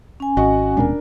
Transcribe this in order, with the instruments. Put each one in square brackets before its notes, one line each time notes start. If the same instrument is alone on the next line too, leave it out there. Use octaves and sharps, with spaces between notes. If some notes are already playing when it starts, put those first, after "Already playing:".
[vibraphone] C#4 G#5
[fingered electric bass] G#1 [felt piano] F#4 D#5 F#5
[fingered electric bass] D#1 B2 G#3 [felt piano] D4 A#4